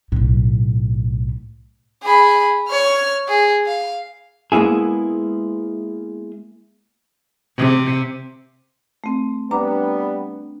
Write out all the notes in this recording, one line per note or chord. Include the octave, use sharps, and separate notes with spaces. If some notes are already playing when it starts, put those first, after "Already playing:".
B1 A2
G#4 B5
C#5 F6
G#4
F5
G#3 A#3 B3 E4 G#4
C3
A3 C4
G3 B3 D4 A#5 D6